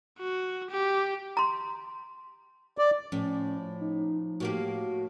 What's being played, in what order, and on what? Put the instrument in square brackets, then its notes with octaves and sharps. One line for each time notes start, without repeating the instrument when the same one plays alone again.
[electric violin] F#4
G4
[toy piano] A#5 C6
[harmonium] D5
[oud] A2 [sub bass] F3 [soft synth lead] C#4
[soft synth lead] D#4
[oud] A2 A#3 G4 [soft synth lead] F#4